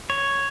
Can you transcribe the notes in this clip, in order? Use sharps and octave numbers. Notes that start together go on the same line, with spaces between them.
C#5